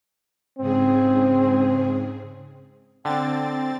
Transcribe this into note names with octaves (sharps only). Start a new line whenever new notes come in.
G#2 C#3 C4 G#4
D3 C4 G5 A6